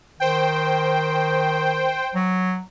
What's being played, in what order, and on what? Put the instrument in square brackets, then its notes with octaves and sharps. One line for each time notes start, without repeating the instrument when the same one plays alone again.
[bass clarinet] D#3 [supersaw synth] C5 G5
[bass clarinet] F#3